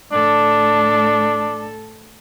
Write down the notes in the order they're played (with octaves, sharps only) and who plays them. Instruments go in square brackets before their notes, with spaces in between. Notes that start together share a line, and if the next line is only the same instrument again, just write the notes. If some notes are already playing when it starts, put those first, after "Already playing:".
[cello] A2 A4 [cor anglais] D4